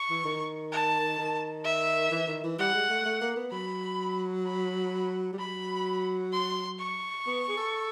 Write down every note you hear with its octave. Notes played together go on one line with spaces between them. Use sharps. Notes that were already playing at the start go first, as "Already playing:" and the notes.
Already playing: C#6
E3
D#3
A5
D#3
E5
E3
D#3
E3
G3 F#5
G#3
A3
A3
A#3
B3
F#3 B5
B5
G3
F#3 B5
C6
C#6
B3
G#4
A4